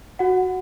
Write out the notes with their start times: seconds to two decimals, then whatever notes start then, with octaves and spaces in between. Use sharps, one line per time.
0.19 F#4 F#5